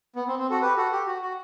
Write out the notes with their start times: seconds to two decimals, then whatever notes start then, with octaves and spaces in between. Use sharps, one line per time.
0.16 B3
0.28 C4
0.39 C4
0.50 F#4 A4
0.62 G4 B4
0.77 F#4 A4
0.92 G4
1.07 F#4
1.22 F#4